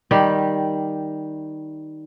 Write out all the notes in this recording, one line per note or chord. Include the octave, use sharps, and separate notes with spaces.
D#3 G3 G4